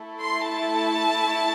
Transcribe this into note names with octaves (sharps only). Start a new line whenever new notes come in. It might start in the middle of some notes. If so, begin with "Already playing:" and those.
Already playing: A3 E4 A4
C6
A5